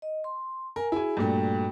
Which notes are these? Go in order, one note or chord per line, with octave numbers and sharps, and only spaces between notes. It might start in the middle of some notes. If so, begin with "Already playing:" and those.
D#5
C6
A#4 G#5
E4 F#4 G#4 G#5
G2 A#2 A3 F#4 G5